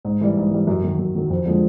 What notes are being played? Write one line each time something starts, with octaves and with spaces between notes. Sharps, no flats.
G#2
E3 G3
G#2
E3 G3
F#2
D#3 F#3
F#2
D#3 F#3
F2
D3 F3 G#3